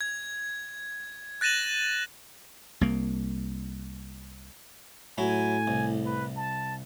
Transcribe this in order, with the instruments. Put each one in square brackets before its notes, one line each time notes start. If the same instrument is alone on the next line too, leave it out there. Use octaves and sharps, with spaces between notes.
[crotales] G#6
F#6 A6 A#6 D#7 E7 F#7
[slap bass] C2 A#3
[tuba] A2 [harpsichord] F#3 E4 [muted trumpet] G#5
[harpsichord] C2
[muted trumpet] B4
A5